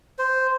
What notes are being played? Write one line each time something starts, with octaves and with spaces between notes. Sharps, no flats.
C5